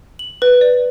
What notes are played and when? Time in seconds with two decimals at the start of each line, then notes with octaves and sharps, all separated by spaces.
0.19 F#7
0.42 B4
0.61 D5